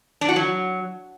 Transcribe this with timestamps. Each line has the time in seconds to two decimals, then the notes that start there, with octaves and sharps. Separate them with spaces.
0.21 D4
0.29 F#4
0.36 F#3